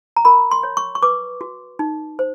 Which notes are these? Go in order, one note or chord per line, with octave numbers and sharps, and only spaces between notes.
A#5
A#4 B5
C6
C#5
C#6
C#6
B4 D6
F#4
D#4
C5